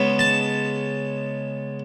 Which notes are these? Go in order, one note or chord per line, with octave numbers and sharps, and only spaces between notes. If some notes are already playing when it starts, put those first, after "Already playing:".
Already playing: C#3 G#3 B3
A5